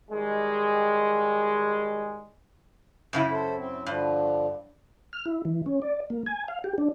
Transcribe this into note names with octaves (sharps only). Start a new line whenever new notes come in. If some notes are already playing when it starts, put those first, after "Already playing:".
D#3 G3 G#3
F#2 C#3 E4
A4 C5
C4
G2 D3 F3
F6
E4
E3
C#4
D5
A#3
G#5
F5
G4
D4